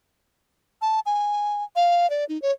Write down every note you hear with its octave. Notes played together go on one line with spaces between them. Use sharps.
A5
G#5
F5
D5
D#4
C#5